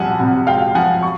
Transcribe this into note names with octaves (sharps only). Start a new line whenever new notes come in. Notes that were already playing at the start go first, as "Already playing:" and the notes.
Already playing: C2 F3 F#5 G#5 A5
C3
G#3 F5 G5
F3 F#5 G#5
C#6